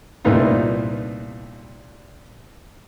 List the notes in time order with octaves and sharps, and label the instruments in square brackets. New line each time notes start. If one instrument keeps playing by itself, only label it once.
[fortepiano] C2 A#2 A3 B3 D#4 F4